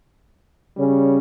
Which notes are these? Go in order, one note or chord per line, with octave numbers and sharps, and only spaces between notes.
C#3 G3 C#4